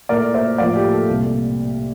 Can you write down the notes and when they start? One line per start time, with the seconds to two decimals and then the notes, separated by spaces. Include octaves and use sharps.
0.09 A#2 A3 E4 A#4 D5
0.34 C5 E5
0.58 A2 F3 A#3 F4 D5 F5
0.75 G4
0.92 A4
1.09 C2 A#2 A3